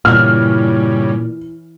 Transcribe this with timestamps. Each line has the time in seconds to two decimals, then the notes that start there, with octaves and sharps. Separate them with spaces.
0.05 G2 A#2 C#3 E3 C#4 E4 F6